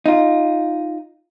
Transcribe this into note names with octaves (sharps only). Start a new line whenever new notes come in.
D#4 F4